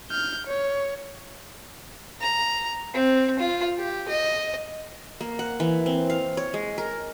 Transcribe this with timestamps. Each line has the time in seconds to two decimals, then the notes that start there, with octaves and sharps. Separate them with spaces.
0.10 F6 G6
0.47 C#5
2.20 A#5
2.94 C4
3.39 F4
3.78 G4
4.08 D#5
5.21 A#3
5.39 F#5
5.60 E3
5.86 C4
6.10 F5
6.37 C#5
6.54 G#3
6.78 A#4